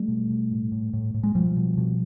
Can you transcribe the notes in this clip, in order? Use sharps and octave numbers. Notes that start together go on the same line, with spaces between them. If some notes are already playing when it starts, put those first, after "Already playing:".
Already playing: G3 A3
B2
B2
A2
A2
A2
A2
G#3
B2 F3 G3
B2
B2